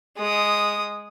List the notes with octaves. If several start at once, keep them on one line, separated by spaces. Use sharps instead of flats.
G#3 D#6